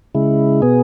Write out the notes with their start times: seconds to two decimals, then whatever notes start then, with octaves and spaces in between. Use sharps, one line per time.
0.15 C#3 G#3 E4
0.62 B2 B3 G#4